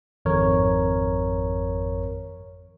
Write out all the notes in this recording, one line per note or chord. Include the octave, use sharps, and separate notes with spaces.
G#1 F2 A#4 C#5